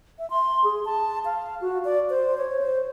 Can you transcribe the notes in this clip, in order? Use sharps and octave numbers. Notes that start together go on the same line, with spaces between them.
E5
C6
G#4
A5
F5
F#4
D5
C5
C#5
C5